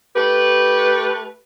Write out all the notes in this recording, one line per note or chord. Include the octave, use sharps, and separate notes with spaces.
A3 G4 B4